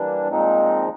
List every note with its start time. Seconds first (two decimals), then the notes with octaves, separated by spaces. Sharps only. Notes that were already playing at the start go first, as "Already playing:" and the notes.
Already playing: E3 G3 A#3 D4
0.28 A#2 F3 G#3 C4 D#4